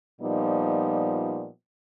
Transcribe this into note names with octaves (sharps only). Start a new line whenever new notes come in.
A#2 F3 G3 B3 D#4 D#5